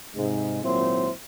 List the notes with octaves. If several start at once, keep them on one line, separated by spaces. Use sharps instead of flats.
G#2 C3 G#3
G#1 A#2 F#3 C4 E4 C5